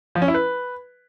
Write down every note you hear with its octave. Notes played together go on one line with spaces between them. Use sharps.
F3
C#4
E4
B4